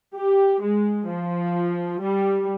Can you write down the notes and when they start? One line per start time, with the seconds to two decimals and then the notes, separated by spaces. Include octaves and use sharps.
0.17 G4
0.62 G#3
1.08 F3
2.00 G3